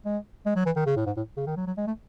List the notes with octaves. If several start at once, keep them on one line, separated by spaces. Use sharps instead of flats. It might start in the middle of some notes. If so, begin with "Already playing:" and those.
G#3
G#3
F#3
E3
D#3
C#3
A2
G#2
A2
C#3
D#3
F#3
F#3
G#3
A3